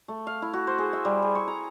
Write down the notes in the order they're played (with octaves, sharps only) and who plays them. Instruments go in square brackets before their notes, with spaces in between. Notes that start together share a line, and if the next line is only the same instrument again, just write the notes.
[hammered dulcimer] A3
F5
E4
F#4
C5
G#4
E5
G3
G#4
C#6
A#5